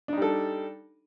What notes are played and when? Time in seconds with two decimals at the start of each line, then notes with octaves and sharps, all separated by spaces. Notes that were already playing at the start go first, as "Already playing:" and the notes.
0.08 D4
0.13 D#4
0.17 G3
0.22 A4